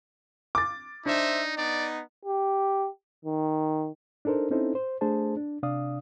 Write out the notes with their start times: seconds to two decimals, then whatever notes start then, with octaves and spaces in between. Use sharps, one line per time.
0.55 D6 A6
1.06 D4 D#4 C5 E5
1.57 B3 D#4 D5
2.25 G4
3.25 D#3
4.25 D4 D#4 A4 A#4 C5
4.51 C4 C#4 D#4 E4 A4 C5
4.75 C5
5.01 A3 D4 G#4 C5 A5
5.37 D4
5.63 C3 D4 D5 F5 D#6